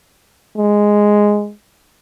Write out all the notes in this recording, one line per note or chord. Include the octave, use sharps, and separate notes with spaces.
G#3